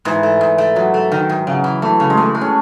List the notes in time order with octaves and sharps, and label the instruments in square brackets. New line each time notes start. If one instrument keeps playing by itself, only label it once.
[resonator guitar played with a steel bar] G#2 [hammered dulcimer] E3
[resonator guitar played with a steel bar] A3
G#2
A3
[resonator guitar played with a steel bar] G#2 [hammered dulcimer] F#3
[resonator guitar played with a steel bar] A3
D#3
G#2
[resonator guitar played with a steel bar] C#3 [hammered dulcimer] F#3
[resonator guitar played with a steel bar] E3
[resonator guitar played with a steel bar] E3 [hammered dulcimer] A3
[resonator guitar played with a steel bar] C#3
[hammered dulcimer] G#3
[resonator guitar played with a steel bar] E3 [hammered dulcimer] A3
[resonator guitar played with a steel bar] G#3
[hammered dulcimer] C#4